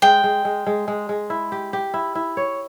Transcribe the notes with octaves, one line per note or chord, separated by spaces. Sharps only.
G#3 G5
G#3
G#3
G#3
G#3
G#3
E4
G4
G4
E4
E4
C#5